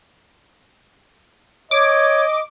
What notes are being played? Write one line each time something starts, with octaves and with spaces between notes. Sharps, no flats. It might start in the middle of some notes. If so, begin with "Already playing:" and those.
C#5 D#5 D6